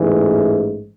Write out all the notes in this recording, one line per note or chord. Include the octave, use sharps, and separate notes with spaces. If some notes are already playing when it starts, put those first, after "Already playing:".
Already playing: A1 G#2 E3